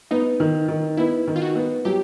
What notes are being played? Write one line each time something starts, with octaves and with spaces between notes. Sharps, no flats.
B3 D#4
D#3
D#3
B3 E4
D#3
F4
F#4
B3
F#3 G4